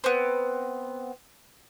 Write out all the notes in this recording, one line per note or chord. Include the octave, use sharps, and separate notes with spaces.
B3 C4